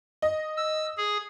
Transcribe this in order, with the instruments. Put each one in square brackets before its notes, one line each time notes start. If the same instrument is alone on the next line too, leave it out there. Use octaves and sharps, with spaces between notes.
[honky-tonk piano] D#5
[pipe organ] E6
G#4